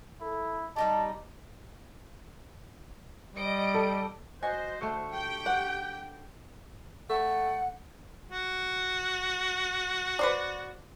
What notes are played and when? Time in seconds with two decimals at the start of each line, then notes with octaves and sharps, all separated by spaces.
0.22 E4 A4
0.76 G3 D#4 G4 D#5 A5
3.35 G3 D#5 D7
3.74 A4
4.43 F#4 C5 D#5 G#5
4.81 D3 A3 C#6
5.14 G4 G5
5.46 F#5
7.10 A3 F#5
8.31 F#4
10.19 B4 C5 D5